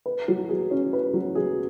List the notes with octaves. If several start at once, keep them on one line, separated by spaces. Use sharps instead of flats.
B4
F#3
G#4
C#4
B4
F#3
G#4